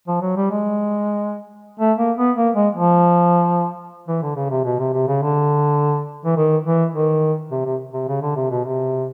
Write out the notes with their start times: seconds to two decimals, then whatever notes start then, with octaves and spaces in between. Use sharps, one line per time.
0.08 F3
0.22 F#3
0.37 G3
0.51 G#3
1.80 A3
1.98 A#3
2.18 B3
2.36 A#3
2.55 G#3
2.74 F3
4.08 E3
4.22 D3
4.36 C#3
4.50 C3
4.65 B2
4.79 C3
4.94 C3
5.08 C#3
5.22 D3
6.25 E3
6.37 D#3
6.65 E3
6.94 D#3
7.51 C3
7.65 C3
7.94 C3
8.08 C#3
8.22 D3
8.36 C3
8.51 B2
8.65 C3